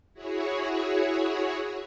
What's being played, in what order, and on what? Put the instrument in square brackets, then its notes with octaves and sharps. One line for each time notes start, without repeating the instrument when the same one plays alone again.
[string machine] E4 F#4 G#4 C#5